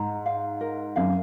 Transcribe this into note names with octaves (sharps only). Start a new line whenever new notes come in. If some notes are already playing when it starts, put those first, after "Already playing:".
Already playing: G#2 A#5
F5
A#4
F#2 F5